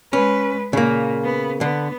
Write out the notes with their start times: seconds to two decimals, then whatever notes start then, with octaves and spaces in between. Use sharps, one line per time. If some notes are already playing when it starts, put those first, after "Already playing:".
0.13 G#3 C#4 B4
0.73 A#2 C#3 A#3
1.24 B3
1.61 D3 B3